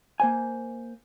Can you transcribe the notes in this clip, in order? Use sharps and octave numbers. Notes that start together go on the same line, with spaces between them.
A#3 C5 G#5